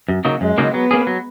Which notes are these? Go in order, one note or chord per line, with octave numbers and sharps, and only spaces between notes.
F#2
C#3 F#3 A#3 D#4
F#2 G#3
C#3 F#3 A#3 D#4
F#3 B3
A#3 C#4 G#4
F#3